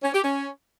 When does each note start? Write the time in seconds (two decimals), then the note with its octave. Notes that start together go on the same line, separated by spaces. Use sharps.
0.02 C#4
0.13 G4
0.23 C#4